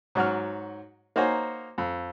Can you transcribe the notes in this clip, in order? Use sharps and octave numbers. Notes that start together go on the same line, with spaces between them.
G#2 F#3 F#4 F6
A#3 D#4 F#4 C5 C#5 G#5
F2